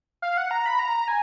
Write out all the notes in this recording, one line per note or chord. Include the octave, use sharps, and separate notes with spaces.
F5
F#5
A#5
B5
A#5
G#5